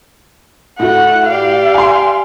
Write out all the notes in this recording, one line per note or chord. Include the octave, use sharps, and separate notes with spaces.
A2 A3 F#4 F#5
G4 D5 F5
G#5 C6